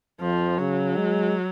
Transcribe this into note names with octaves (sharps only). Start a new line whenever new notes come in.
F2 F3
C#3 F#3
G#3